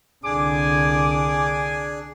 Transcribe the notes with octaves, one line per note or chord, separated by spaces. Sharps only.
C2 D3 D4 G#4 G#5 D6